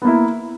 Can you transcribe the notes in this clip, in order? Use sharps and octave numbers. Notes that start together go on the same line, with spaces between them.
A#3 B3 E4